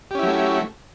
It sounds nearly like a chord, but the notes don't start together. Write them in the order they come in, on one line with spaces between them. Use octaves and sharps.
G4 C#4 E4 F#3 A3